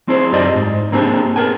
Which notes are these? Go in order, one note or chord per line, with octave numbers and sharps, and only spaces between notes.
C4 E4 G#4 C5
F#2 F4 G4 D5 D#5
G#2
A#3 C4 D4 G4 G#4
B3 G#4 A#4 G5 G#5